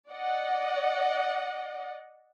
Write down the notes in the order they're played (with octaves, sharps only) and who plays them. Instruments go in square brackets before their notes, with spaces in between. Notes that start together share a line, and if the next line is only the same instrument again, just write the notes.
[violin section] D5 D#5 F#5